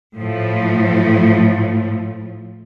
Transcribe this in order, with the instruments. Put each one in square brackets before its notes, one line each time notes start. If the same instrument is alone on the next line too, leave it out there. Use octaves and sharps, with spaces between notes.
[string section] A2 F3